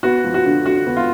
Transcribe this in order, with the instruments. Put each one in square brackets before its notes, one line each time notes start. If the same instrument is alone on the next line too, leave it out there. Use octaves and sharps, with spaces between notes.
[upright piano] B3 [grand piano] F#4
[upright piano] F3
[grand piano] F#4
[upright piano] D3
[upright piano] D3 [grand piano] F#4
[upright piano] B3
[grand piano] F4